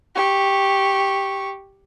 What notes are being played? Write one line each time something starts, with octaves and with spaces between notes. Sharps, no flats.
G4 C#6